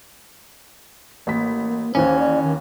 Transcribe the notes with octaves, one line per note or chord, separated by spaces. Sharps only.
A1 A#3 B6
D#2 E3 A#3 C#4 C5
D5
D#3